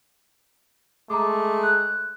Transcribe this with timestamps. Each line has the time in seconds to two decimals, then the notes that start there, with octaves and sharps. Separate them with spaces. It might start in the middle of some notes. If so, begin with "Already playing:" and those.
1.10 G#3 A3 A#5 D6
1.63 F#6